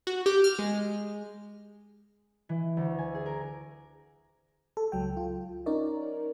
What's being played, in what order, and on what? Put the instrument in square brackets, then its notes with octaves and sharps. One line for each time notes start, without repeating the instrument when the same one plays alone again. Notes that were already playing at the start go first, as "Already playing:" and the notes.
[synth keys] F#4
G4
F6
G#3
[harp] E3
D2
G#5
G#4
A#4
[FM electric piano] A4
C#2 F#3 G5
F4
C#4 D#4 A#4 C#5 D5